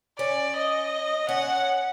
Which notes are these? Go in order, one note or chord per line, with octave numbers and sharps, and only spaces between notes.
C#4 D5
D#5
C#4 F#5